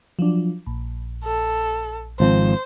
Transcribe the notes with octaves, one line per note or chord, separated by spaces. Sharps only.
F3 F#3 D4
A#1
A4
G#1 F3 C4 C5